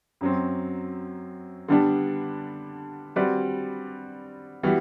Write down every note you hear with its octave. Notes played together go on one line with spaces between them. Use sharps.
F#2 F#3 C4
D3 G3 B3 D4
G3 C4 F#4 B4 D5
E3 G3 B3 F#4